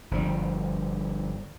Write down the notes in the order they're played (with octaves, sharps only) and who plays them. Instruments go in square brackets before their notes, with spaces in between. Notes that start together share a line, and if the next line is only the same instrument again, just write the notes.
[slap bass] G1 F3 G3